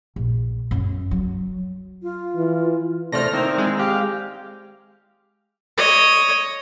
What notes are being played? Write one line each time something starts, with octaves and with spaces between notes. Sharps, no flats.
A#1
F#2
F#3
F4
E3
C3 A3 C5 D5 F6 A#6
D#3 A#3 C4 E4
G#3
G4 F5
C#5 D#5